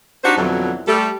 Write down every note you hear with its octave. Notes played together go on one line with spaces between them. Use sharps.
D4 D#4 F#4 G4 C5 D5
F2 B2 D3 E3 F#3
G3 A3 A4